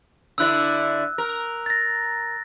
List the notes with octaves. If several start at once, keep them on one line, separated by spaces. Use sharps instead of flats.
D3 E4 D5 E6 F#6
A#4
A6 A#6